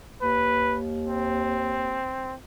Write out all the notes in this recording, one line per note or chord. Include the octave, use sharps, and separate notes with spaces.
D#2 B4
C4